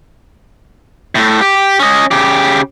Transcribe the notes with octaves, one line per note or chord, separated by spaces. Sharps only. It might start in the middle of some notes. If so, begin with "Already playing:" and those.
A2 A3
G4
C#4 D#5
C#3 G4